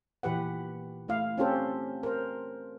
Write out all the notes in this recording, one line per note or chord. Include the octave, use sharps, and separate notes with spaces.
A#2 E3 G4 B4 F#5
A3 E4 F5
C4 C#4 F4 G4 A4 C5
A#4 C5